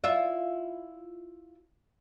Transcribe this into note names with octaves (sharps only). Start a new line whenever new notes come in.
E4 F4 E5